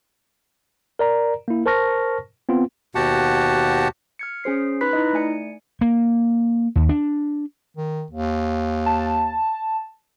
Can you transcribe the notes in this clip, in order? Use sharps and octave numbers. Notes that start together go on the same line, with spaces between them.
A#4 D5 A#5
A#3 E4
A#4 C5 A5 C#6 F6 A#6
B3 C4 F4
D#2 B2 F#4 G4 F#5 A5
F6 G#6 C#7
C#4 G#4 C5 C7
D#4 B4 B5 C6 F#6 B6
D#4 E4 D#5
A3 D5 G#5 C#7
A#3
D#2
D4
D#3
D#2
A5